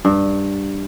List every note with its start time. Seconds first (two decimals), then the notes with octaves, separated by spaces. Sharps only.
0.05 G2